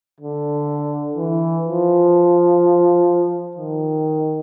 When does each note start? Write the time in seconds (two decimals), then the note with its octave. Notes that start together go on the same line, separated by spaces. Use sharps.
0.20 D3
1.17 E3
1.65 F3
3.57 D#3